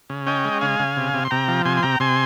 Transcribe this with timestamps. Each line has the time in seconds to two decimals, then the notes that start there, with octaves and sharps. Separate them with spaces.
0.10 C#3
0.27 C#4 D#5 G5
0.45 G#3
0.61 C#3 F5 G#5
0.80 C#3
0.97 C3
1.14 C3
1.25 C6
1.31 C3 G5 A#5
1.48 F3
1.65 C3 G#5 C6
1.77 C6
1.83 C3 G5 A#5
2.00 C3 G#5 C6